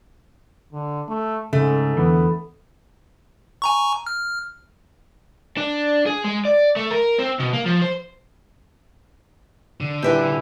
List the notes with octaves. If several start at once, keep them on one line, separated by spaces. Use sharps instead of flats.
D3
A3
G#2 C#3 A3
E2 G#2 D3 E3 B3
G#5 A#5 C#6
F6
D4
G#4
G#3
D5
A3
A#4
C4
B2
A#3
F3
C5
D3
D#1 E4 B4 E5 G5